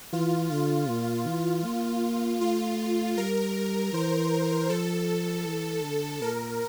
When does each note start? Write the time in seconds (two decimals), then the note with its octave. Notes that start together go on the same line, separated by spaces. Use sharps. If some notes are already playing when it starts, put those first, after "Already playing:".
0.13 E3 F4
0.51 D3 F4
0.89 A#2
1.28 E3
1.65 A#3
2.41 A3 F4
3.18 G3 A#4
3.93 E3 C5
4.70 F3 A4
5.46 E3
5.84 D3
6.22 A#2 A#4